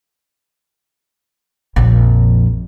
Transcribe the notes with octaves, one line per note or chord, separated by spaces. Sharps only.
A#1 F2